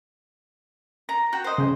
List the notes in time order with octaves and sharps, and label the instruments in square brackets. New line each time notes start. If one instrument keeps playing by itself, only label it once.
[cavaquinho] A#5
F#4 G5
C5 D#5
[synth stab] C#3